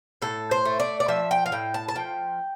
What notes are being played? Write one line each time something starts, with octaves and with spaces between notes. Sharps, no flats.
A2 A4
C5
A3
D5
D5
F3 E5
G5
F5
A2 G5
A5
A5
F3 G5